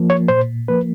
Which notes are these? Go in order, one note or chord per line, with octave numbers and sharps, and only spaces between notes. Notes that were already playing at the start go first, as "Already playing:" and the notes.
Already playing: F3 A#3
C#5
A#2 C5
F3 A#3 B4